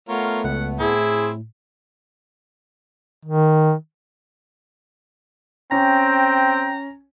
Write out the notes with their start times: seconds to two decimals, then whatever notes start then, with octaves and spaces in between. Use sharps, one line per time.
0.09 A3 B3 F4 A#4 C#5
0.44 C#2 F#5
0.80 A2 C4 E4 G#4
3.25 D#3
5.72 C4 C#4 G5 A#5